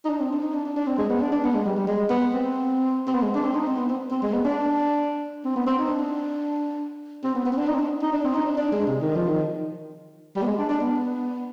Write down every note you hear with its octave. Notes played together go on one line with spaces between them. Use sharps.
D#4
D4
C4
D4
D#4
D4
D4
D4
C4
G#3
B3
D4
D4
B3
G#3
G3
G3
G#3
B3
C4
C4
B3
G#3
D4
C4
D#4
C4
B3
C4
C4
G#3
B3
D4
C4
B3
C4
D#4
D4
C4
B3
B3
C4
D4
D#4
C4
D4
D#4
D4
C4
D#4
D4
D4
G#3
C3
D#3
F3
D#3
G3
B3
G#3
D4
D4
B3